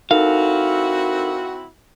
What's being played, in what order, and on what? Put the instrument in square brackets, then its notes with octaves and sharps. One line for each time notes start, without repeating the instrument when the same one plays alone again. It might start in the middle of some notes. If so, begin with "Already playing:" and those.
[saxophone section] C4 E4 F#4 [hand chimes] D#4 A4 A#4 [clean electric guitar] F5